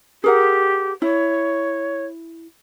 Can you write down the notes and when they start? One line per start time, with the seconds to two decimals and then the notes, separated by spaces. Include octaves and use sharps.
0.24 G4 G#4 A#4 F#5
1.02 E4 C#5